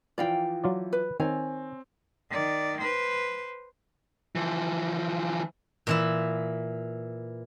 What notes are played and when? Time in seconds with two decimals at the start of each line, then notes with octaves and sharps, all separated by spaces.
0.18 E3 F3 D5 F5 G5
0.64 F#3 F4 D5
0.93 B4
1.20 D#3 C4 C#5 G#5
2.30 D#3 D5
2.81 B4 C5
4.35 E3 F3
5.87 A#2 E3 E4